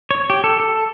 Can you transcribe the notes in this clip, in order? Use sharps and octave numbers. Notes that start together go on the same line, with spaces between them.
C#5
G4
A4
A4